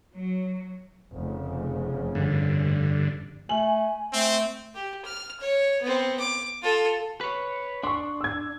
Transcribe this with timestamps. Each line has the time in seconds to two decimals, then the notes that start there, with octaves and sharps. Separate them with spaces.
0.15 F#3
1.12 F1 C#3
2.15 G2 D3
3.49 A3 G#5 F#7
4.13 A3 C4
4.75 G4
5.05 F6
5.40 C#5
5.82 B3 C4
6.20 D6
6.62 F4 A4
7.21 B4 C#5
7.83 D4 C6 C#6
8.21 E6 G#6